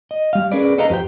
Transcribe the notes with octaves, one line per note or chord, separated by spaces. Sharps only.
D#5
G3 F5
C#4 G#4 A#4 B4 D5
A4 B4 D#5 F5 A#5
F2 G4 C5 G5